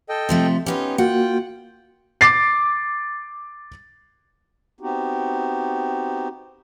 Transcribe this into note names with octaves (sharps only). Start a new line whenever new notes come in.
A4 D#5 G5
C3 F3 A3
B3 C#4 D#4 F4 G4
A#3 F4 F#4 F#5 G5
D6 A6 C7
B3 C4 D#4 F#4 G4